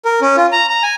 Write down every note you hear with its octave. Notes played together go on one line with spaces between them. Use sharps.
A#4
C#4
F4
A#5
A#5
G#5